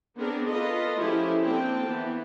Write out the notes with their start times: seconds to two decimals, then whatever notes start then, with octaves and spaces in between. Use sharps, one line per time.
0.16 B3 C4 D4 G#4 A#4
0.48 F4 A4 B4 D#5
0.98 F3 A3 C#4 E4 G4 G#4
1.43 D3 A#3 C4 G5 A5
1.87 E3 B3